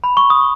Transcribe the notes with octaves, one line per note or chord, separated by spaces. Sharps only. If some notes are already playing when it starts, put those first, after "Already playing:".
B5
C#6
D#6